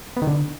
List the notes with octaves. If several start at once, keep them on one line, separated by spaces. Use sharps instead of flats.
B3
D#3
D3